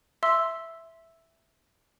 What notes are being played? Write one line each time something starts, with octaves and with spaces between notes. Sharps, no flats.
E5 C6 E6